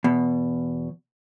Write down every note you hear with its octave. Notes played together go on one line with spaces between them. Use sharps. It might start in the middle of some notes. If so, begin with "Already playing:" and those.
E2 B2